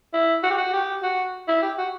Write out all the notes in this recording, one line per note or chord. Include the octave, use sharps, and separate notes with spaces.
E4
F#4
G4
F#4
G4
F#4
E4
G4
F#4